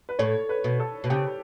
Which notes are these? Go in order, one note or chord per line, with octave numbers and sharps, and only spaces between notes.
B4
A2 C#5
B4
B2
A4
B2
C#3 G4